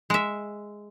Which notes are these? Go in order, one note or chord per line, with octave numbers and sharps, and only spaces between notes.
G#3 E5